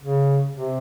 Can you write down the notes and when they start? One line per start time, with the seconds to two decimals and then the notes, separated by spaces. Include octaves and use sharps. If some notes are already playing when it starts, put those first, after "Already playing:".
0.01 C#3
0.53 C3